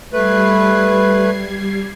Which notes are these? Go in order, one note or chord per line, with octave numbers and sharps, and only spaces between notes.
G3 A3 B4 G#6 C7